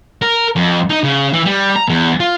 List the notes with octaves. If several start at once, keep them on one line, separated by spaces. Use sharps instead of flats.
A#4
F2
D#4
C#3
E3
G3
A#5
E2
F4